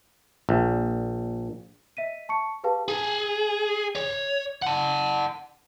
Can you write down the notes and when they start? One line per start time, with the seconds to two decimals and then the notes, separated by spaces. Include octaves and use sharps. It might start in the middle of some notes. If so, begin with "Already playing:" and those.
0.49 A#1
1.97 D#5 E5 B6 D#7
2.29 A5 C#6 C#7
2.64 G4 G#4 B4 F5 G5 A5
2.88 G#4
3.95 C#5
4.62 F#5 A5